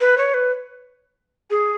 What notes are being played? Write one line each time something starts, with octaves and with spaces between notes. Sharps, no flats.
B4
C#5
B4
G#4